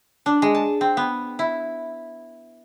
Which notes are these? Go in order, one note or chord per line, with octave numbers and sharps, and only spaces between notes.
D4
G#3
A5
C4
B3
E4